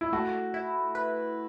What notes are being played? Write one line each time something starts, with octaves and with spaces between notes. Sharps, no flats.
E4
A3 F#4
E4
B4